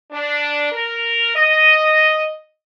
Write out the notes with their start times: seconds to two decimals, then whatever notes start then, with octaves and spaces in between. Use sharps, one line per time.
0.12 D4
0.72 A#4
1.34 D#5